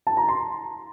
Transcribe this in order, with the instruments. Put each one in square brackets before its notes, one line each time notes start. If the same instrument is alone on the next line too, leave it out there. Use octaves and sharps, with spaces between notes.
[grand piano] A5
A#5
C6